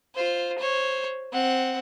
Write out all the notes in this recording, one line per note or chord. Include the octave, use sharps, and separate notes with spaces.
F4 C5
C5 C#5
C4 F#5